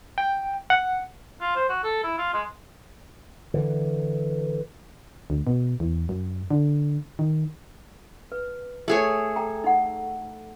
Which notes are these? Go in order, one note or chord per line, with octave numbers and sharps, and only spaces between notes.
G5
F#5
F4
C5
F#4
A4
E4
F4
G#3
D3 E3
D2
B2
E2
F#2
D3
D#3
B4
A3 G#4 C#5
A4 G5 A#5
D#4 F#5